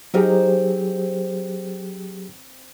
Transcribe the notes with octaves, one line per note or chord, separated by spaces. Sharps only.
F#3 C4 D#4 G4 G#4 A#4